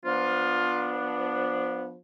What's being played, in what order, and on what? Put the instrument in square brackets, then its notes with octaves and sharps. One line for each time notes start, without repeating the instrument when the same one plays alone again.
[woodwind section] F3 B3 D4 F4